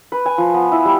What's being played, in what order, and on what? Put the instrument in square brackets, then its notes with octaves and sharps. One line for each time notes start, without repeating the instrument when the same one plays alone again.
[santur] B4
G#5
F3
B3
E4
G3